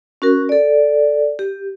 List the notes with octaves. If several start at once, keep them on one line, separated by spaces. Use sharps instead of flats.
C#4 F#4 A#4
A4 D5
G4